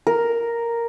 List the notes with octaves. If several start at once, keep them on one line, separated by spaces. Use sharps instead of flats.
A#4